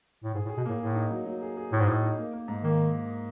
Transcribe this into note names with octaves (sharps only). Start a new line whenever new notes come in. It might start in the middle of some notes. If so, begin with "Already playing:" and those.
A2
G#2 G#4
A2
G#4
B2
A2 A#3
A2 G#4
D#4
F#3
F#3
G#4
G#4
A2 G#4
G#2
A2 D#4
D#4
A#3
A#3
G#2
D#3 A#3